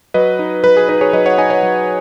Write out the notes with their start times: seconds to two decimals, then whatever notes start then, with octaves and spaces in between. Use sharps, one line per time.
0.14 F#3 B4 D#5
0.39 D#4
0.64 F#3 B4
0.77 G#4
0.89 D#4 B4
1.01 G#4 C#5
1.13 F#3 B4 D#5
1.26 C#5 F#5
1.38 D#4 D#5 G#5
1.50 C#5 F#5
1.63 F#3